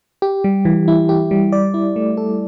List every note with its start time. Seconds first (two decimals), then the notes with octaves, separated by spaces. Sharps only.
0.22 G4
0.44 G3
0.65 E3
0.88 E4
1.09 G4
1.31 G3
1.52 D5
1.74 E4
1.96 A3
2.17 A4